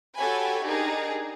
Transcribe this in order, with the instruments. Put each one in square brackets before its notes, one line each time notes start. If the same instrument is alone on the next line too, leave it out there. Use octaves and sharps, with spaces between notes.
[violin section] F#4 G4 A4 C#5 G#5 B5
D4 D#4 G4 G#4 A#4